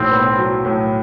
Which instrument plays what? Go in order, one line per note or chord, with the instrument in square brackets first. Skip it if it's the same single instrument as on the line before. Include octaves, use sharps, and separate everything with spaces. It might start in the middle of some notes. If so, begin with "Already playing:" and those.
Already playing: [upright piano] B1 A2 [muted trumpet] C4
[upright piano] B3
F#3
A2